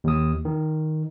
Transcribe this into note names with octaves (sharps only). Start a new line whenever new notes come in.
D#2 D#6
D#3